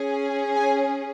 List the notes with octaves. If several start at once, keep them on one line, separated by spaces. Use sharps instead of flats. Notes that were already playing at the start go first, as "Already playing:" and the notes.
Already playing: C#4 G#4
G#5